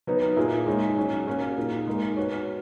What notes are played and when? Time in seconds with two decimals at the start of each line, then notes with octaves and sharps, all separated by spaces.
0.07 F#3 B3 D#4
0.36 A#2 A#3 E4 G#4
0.66 G#3 D#4 G#4 C#5
0.97 F#3 C#4 G#4 C#5
1.27 A#3 C#4 F#4
1.58 A#2 A#3 D#4 G#4
1.87 G#3 D#4 A#4
2.17 B3 F#4 C#5